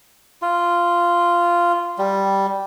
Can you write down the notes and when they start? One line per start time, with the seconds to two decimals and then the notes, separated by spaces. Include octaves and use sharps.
0.42 F4
1.98 G3